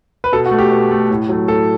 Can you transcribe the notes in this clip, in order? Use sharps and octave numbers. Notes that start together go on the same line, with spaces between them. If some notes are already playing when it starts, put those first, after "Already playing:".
B4
B2 A4
F#4
A3
G4
B2
A3
A2
F#3 A3
A2 A4